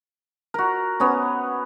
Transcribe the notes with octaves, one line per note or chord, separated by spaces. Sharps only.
F#4 A#4
B3 C#4